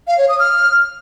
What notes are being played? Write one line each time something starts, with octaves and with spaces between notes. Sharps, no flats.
F5
C#5
D#6
F6